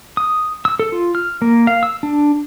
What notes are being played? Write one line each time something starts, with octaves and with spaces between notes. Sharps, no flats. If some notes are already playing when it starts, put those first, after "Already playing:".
D#6
E6
A4
F4
F6
A#3
F5
E6
D4